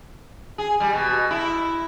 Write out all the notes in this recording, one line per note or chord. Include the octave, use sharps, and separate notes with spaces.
G#4
G3
B2
E4